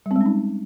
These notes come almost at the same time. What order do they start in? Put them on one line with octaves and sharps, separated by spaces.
G3 C4 G#3 C#4 D#4